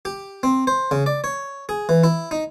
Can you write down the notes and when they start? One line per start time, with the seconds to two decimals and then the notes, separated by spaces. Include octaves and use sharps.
0.05 G4
0.43 C4
0.67 C5
0.91 C#3
1.06 D5
1.24 C#5
1.69 G#4
1.89 E3
2.04 E4
2.31 D#4